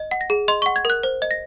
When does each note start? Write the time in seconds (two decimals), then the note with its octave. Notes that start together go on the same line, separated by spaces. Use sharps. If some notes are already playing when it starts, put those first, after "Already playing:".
Already playing: D#5
0.11 F#5
0.21 A#6
0.30 G#4
0.48 D#5 C6
0.62 F#5 C#6
0.76 G#6
0.85 A#4 F#6
1.03 C5
1.22 D#5
1.31 A#6